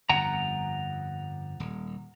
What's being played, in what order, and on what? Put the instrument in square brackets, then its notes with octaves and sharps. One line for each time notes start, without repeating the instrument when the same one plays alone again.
[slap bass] G1 F2 [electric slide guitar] F#5 A#5
[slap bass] D#1